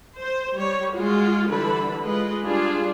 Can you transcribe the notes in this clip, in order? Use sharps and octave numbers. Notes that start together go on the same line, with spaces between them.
C5
G3 C#5
G#3 F4 F#4
D3 E3 G3 A4 B4 B5
G#3 F4 B4 D#5
G3 D4 F4 G#4